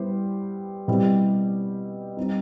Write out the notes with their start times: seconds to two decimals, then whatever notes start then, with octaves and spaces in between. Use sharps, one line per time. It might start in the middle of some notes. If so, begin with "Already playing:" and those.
Already playing: G3 B3 E4 G4 C5
0.88 B2 G3 C4 E4 G4
2.17 G3 C4 D#4